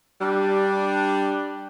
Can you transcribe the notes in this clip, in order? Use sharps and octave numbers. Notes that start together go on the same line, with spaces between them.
G3 D4